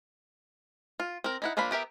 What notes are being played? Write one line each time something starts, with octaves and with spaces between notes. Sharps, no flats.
F4
C4 A#4
D#4 E4 F#5
F3 A#3 D4 F5 B5
B3 G4 A#4 E5